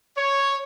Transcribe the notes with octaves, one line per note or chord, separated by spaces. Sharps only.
C#5